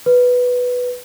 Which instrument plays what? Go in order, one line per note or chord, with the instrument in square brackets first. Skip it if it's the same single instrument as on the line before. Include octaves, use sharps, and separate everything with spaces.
[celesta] B4